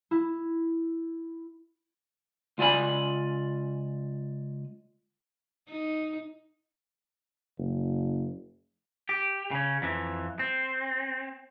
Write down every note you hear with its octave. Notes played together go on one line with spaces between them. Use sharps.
E4
C#2 F4 D5 G#5 B5
D#4
F#1
G4
C#3 C#4
F2 E3
C4